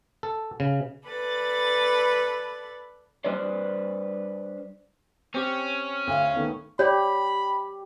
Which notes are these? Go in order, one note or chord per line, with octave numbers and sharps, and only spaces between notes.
A4
C#3
A4 B4 D5 B5 A6
G3 D4 B4 C5 D5
C4 C#4 G4
D2 F5
D#3 A3 B3
G4 C#5 D5 B5